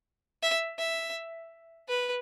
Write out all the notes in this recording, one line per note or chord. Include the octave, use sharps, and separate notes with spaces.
E5
E5
B4